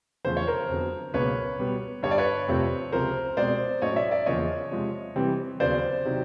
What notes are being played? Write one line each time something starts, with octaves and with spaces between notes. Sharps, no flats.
E2 C#3 F3 A3 C#4 C5
C#5
A#4 C5
F2 D3 F#3 B3
C#2 B2 F#3 A#3 B4 C#5
B2 G3 B3
G2 D3 G3 C#5
D5
B4 C#5
F2 C3 F3 A3 C4
C#2 C3 F3 A#4 C5
B2 G#3 C4 C5 D5
A2 F#3 A3 C#4 C#5 D#5
D5 E5
D5 E5
E2 C#3 F3 A#3 C#5 D#5
C3 F3 G#3
C3 E3 G3 C4
D#2 C#3 F#3 B3 C5 D5
C3 D#3 F#3